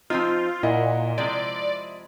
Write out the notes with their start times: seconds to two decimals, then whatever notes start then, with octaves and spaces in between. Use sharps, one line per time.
0.10 F3 C4 D#4 F4
0.63 A#2 E4 D#5 F#5
1.18 C3 F3 G#3 D5